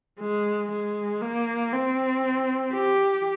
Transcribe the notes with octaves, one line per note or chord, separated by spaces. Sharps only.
G#3
G#3
A#3
C4
G4